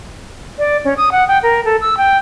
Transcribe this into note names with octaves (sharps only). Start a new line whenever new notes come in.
D5
C#4
D#6
F#5
G5
A#4
A4
E6
G5